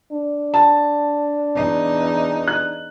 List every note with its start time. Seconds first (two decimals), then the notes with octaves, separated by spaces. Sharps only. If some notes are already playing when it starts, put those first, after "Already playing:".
0.11 D4
0.54 A5
1.55 E2 D#4
2.48 F#6